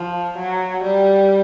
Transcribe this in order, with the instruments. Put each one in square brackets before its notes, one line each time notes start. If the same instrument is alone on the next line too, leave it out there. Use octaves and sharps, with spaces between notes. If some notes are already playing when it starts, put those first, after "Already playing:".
Already playing: [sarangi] F3
F#3
G3